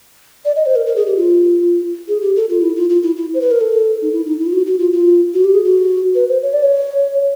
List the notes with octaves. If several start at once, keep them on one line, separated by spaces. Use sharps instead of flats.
D5
D#5
C5
A#4
A#4
G#4
G4
F4
G#4
G4
A4
F4
E4
F4
F4
E4
E4
C5
B4
A#4
A4
D#4
E4
D#4
E4
F4
F#4
F#4
F4
F4
F#4
G4
G#4
F#4
B4
C5
C#5
D5
C#5